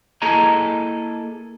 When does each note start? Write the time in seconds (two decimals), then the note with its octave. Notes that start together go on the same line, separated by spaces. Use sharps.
0.22 A#3 E4 G#4 A4 D#5 A#5